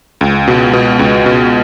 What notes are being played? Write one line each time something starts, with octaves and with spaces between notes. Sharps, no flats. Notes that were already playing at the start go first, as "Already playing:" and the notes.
C#2
B2
B2
C#2
B2